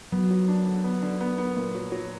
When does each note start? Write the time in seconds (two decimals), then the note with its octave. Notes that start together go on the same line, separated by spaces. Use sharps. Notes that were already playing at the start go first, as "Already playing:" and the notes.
0.12 F#3 B3
0.31 F#3
0.48 D4
0.66 D3
0.84 B3
1.02 D3
1.21 B3
1.38 B3
1.56 A#2
1.75 F#3
1.92 F#3